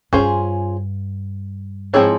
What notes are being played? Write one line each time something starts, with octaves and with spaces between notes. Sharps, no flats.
G2 C#4 F4 G#4 C5
G#2 F3 C4 E4 G#4 C#5